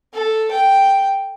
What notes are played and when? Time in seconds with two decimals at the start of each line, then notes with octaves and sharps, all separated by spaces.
0.14 A4
0.51 G5